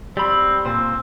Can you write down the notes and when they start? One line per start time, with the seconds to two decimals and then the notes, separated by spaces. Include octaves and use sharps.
0.17 G3 C4 B5
0.66 A#2 C4 C5